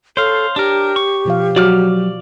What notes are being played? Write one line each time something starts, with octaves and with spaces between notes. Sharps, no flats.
A4 C5 C#5 F5
D4 G4 A#4
C#6
B2 F3 F5
F#3 F#4 D5 D6 F6